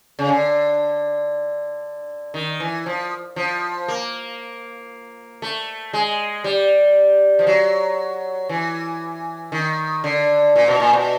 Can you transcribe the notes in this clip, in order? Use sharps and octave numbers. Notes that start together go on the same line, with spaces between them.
C#3
D3
D#3
E3
F3
F3
A#3
A3
G#3
G3
F3
F#3
E3
D#3
D3
A#2
B2
A#2
B2